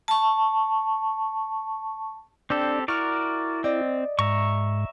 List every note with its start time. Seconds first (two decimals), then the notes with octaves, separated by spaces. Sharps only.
0.08 A5 C#6
2.50 C4 D4 G4 A4 D5
2.88 E4 F#4 A#4 D5 C#6 F6
3.64 C4 D5 D#5
4.19 G#2 E5 A#5 C#6